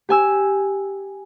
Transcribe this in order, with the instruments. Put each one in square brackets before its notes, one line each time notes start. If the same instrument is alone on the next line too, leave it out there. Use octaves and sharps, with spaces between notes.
[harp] G4 G#5 E6